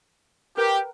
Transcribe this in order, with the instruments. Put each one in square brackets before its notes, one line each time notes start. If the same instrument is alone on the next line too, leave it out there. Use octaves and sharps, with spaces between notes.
[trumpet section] G4 [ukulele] A#4 B4 G5